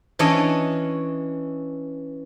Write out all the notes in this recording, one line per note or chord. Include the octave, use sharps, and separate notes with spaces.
E3 C#4 D4 C#5 D#5